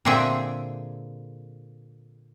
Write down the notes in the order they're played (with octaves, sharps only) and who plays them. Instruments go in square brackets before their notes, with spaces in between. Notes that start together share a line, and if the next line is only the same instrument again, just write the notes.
[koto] A#2 D3 C4 G#4 E5 G5